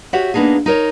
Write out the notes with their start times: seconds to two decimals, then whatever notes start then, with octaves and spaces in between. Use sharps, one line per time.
0.13 F#4 G4 C#5 E5 F#5
0.34 A#3 B3 D4 D#4 G#4
0.66 D#4 A#4 C#5